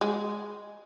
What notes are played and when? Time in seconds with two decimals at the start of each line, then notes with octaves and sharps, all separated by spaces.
0.01 G#3